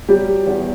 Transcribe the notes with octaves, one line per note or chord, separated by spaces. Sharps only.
F#3 G3 G4
E2